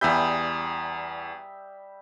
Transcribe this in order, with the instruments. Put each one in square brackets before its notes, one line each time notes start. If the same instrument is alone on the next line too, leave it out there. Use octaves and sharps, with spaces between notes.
[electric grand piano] E2 G#5 G6 [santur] G3 E5 D#6